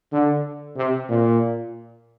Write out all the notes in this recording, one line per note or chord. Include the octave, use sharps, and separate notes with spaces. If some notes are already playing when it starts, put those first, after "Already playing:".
D3
C3
A#2